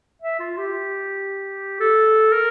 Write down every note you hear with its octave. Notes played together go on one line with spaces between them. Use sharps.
E5
F4
G4
A4
A#4